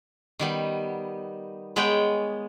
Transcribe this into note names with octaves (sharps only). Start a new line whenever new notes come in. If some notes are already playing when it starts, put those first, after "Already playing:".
D#3 G3 B3
G#3 B3 B4 C#5 F#5 G5